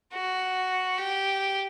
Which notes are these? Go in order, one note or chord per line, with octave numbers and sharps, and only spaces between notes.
F#4
G4